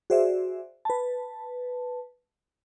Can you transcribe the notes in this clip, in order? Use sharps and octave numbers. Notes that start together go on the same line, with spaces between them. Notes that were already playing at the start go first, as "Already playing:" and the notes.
F#4 G#4 C5 D5 E5
B4 A5